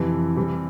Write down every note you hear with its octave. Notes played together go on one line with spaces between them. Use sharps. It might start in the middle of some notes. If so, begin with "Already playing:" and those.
Already playing: F2 C3 E3
C3 E3 G3